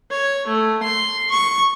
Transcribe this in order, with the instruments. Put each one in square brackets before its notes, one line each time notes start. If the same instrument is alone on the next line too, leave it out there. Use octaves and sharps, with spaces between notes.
[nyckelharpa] C#5
A3
C6
C#6